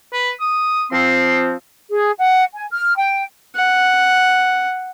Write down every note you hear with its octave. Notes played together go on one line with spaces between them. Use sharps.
B4
D#6
F3 C4 C6
G#4
F#5
G#5
F6
G5
F#5